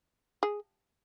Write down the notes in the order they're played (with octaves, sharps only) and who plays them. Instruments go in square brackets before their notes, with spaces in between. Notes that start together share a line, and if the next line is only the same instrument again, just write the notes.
[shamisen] G#4